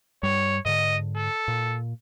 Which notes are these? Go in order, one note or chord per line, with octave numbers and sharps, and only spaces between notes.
G2 G3 C#5
G#2 D3 D#5
A4
A#2